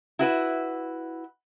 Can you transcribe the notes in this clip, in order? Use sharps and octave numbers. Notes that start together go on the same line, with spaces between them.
E4 F#4 B4